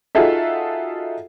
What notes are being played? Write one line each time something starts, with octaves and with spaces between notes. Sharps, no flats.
D#4 F4 F#4 G#4 A4 E5